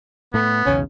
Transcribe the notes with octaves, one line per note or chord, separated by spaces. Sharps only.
A2 A3 B3
B1 E2 C#3 C#4